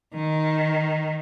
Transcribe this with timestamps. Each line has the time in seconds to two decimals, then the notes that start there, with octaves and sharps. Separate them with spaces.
0.15 D#3